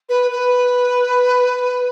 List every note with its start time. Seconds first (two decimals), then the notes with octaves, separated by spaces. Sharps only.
0.09 B4
0.31 B4